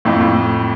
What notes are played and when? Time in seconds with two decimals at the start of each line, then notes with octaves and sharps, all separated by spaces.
0.05 F2 A2
0.21 A2